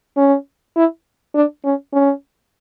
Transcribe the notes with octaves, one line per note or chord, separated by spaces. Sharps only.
C#4
E4
D4
C#4
C#4